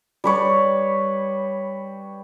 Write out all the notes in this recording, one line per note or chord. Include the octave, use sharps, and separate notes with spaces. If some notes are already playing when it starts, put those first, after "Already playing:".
G3 B4 C#5